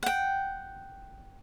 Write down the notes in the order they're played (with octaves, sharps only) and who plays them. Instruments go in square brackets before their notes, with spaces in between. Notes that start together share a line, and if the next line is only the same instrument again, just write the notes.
[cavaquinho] F#5 G5